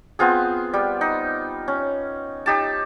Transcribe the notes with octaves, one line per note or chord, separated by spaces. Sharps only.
B3 C4 F4 G#4
G3
D#4
C#4
D#4 G4 A5